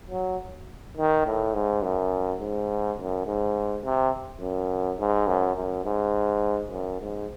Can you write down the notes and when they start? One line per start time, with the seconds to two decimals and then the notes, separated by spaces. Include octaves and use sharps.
0.11 F#3
0.97 D#3
1.26 A2
1.54 G#2
1.83 F#2
2.41 G#2
2.98 F#2
3.27 G#2
3.84 C3
4.41 F#2
5.00 G#2
5.28 F#2
5.57 F#2
5.85 G#2
6.71 F#2
7.01 G#2